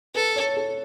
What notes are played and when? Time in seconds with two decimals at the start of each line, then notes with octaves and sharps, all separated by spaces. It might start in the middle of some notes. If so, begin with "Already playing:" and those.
0.15 A4 B4
0.36 C#5
0.57 A4